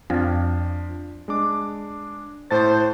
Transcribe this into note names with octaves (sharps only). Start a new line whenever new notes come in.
F2 F3 D4
G#3 D4 D6
A2 C5 A5 A6